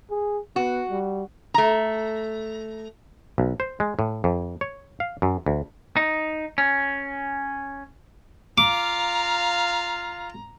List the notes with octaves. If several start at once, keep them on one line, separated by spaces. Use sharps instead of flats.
G#4
B3 F#4
G3
A3 A#5
B1
C5
G#3
A2
F2
C#5
F5
F#2
D2
D#4
C#4
F4 F5 A#5 D6